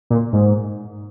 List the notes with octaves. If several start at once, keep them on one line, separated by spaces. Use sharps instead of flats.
A#2
G#2